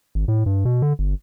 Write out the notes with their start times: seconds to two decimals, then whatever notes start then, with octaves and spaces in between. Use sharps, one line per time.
0.15 G#1
0.28 A2
0.46 G2
0.65 B2
0.82 D3
0.99 G1